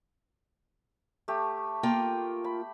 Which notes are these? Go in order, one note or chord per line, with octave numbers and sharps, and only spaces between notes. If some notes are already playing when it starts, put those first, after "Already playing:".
A3 G4
A#3 F4 G5
B5